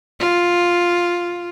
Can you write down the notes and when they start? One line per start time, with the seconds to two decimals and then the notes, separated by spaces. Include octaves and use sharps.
0.20 F4